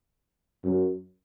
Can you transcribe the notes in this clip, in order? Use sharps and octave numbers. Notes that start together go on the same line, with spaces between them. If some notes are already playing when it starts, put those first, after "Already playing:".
F#2